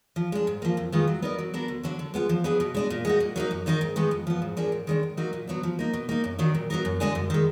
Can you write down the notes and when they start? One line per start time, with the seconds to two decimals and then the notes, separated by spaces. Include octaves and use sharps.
0.16 F3
0.32 G#3 D4
0.47 G#2
0.62 F3 A#3
0.77 F2
0.92 D#3 G#3 B3 F4
1.07 F#3
1.22 B3 D#4 A#4 D5
1.39 F#3
1.54 B3 D4 F#4 A#4
1.68 D2
1.83 D3 F#3 D4
1.99 D3
2.14 G#3 B3 F4
2.29 F3
2.44 B3 D4 G#4 B4
2.60 B2
2.74 G#3 D4 G#4
2.90 A#2
3.05 G#3 D#4 F#4
3.20 A#2
3.36 F#3 A#3 D#4
3.51 F#2
3.66 D#3 A#3 D#4 A#4
3.81 G#2
3.96 D#3 G#3 B3 D#4
4.11 F2
4.27 F3 B3
4.42 G#2
4.57 F3 A#3 D4 G#4
4.72 G#2
4.87 D#3 G#3 D4
5.03 G#2
5.17 F#3 A#3 D#4 F#4
5.33 A#2
5.47 F#3 B3 D4
5.63 F3
5.79 A#3 D#4
5.93 B2
6.09 A#3 D#4
6.24 F#2
6.39 D#3 F#3 D4
6.54 A#2
6.70 F#3 B3 D#4 A#4
6.85 F#2
7.00 D3 G#3 D4 G#4
7.15 F#2
7.30 D#3 G#3